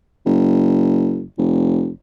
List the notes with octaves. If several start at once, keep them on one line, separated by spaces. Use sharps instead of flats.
F#1
F1